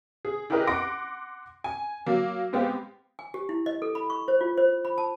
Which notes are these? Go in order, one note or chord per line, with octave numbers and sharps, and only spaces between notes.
G#4
E4 G4 G#4 A#4 B4 D#5
F#5 C6 D6 A#6 D7
G#5
F#3 A#3
G#3 B3 C4 G4 F5
G#5
G4
E4
D#5
A4
B5
C#6
C5
F4
C5
B5
A5